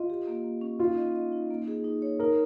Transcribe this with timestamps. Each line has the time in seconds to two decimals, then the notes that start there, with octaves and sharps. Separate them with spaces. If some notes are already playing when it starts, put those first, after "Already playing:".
Already playing: F4 D#5
0.10 G4
0.27 A#3
0.44 A#3
0.61 C#4
0.79 D#4 F4
0.97 D#5
1.15 D#5
1.32 D#4
1.50 A#3
1.68 G#4
1.84 D#4
2.02 C#5
2.19 D#4 A#4